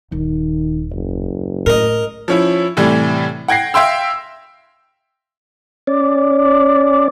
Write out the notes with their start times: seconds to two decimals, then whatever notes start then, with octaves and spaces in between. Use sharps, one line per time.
0.12 D#1 D#3
0.93 F#1
1.66 A2 A#4 D#5
2.28 F3 C#4 E4
2.77 A2 C3 E3 G3
3.48 F#5 G5 G#6 A#6 C7
3.74 E5 F5 G5 C6 E6
5.87 C#4 D5